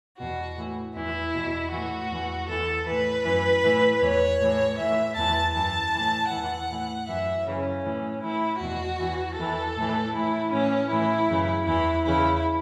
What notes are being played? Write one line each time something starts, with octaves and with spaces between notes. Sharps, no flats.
E2 B2 F#4
A2 E3
E2 E3 E4
E2 B2
A2 E3 F#4
E2 E3
E2 E3 A4
A2 E3 B4
F#2 E3
A2 E3
E2 E3 C#5
A2 E3
A2 E3 E5
E2 E3 A5
F#2 E3 A5
A2 E3
E2 E3 F#5
A2 E3
F#2 E3 E5
F#2 C#3 E3 C#4
A2 E3
A2 E3 E4
E2 B2 F#4
E2 E3
E2 E3 A4
A2 E3
A2 E3 E4
A2 E3 C#4
A2 E3 E4
F#2 C#3 E3
E2 E3 E4
E2 C#3 E3 E4